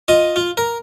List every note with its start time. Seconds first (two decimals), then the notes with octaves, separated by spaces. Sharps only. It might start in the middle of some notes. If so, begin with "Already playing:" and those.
0.08 F4 D#5
0.36 F4
0.57 A#4